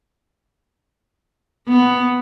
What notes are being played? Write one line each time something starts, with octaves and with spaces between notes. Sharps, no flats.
B3